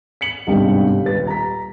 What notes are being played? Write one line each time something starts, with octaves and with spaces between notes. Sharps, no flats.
B6 C#7 F#7
G1 C2 G#2 D3 F5 G5
D#1 B4 A6
A#5 B6